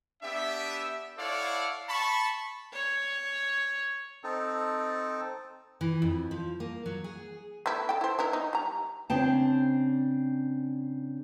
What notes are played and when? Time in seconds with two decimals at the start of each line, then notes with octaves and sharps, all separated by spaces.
0.22 B3 D4 G4 E5
1.17 E4 A4 C#5 D5 F5 F#5
1.89 A5 B5 C#6
2.73 C#5
4.24 C4 D#4 A4
5.81 E3
6.02 F2
6.31 F3
6.60 A#3
6.86 F#3
7.04 G#4
7.66 A3 B3 E4
7.89 A4 G5
8.01 E4 C5
8.19 B3 E4 A#4
8.33 D#4
8.53 G3 A#5
9.10 C#3 C4 D4 G5 A5